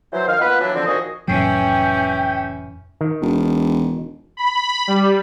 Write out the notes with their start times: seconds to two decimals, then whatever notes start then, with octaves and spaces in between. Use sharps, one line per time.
0.13 E3 F#3 C5
0.27 D#3 F5
0.40 A#3 B3 F4 B4
0.61 E3 F#3 D4
0.74 D3 F3 C4
0.86 A#2 D#3 F3 F#4 G#4 D#5
1.28 F1 A2 E3 F#3 C#4 G5
3.01 D#3
3.22 E1
4.37 B5
4.88 G3